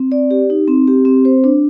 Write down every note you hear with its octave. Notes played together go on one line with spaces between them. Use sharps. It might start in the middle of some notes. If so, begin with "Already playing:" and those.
Already playing: C4
D5
G4
D#4
C4
G4
C4
C5
D4